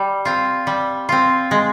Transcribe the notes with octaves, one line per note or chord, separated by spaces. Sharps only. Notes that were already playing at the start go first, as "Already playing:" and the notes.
Already playing: G3
C4 F4
G3
C4 F4
G#3